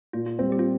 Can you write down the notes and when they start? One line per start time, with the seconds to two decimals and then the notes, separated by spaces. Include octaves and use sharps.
0.13 A#2 F4
0.26 F4
0.39 G3 C4 F4
0.52 G4
0.59 F4